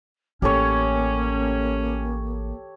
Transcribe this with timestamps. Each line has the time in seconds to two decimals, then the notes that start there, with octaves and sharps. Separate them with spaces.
0.42 A1 A#3 C#4 G4 A4 C#5